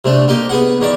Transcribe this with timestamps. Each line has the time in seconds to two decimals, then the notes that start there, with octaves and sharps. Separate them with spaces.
0.05 C3 A3 D4
0.28 A#3 D#4 G4
0.49 B3 G#4 F#5
0.81 E2 D#3 C#5 D5